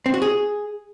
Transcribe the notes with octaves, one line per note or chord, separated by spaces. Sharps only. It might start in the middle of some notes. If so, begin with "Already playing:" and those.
C4
F#4
G#4